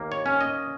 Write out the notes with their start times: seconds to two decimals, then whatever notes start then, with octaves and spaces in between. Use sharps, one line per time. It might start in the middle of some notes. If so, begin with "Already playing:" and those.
Already playing: D#2 A#3
0.12 C#5
0.26 C#4
0.41 D#5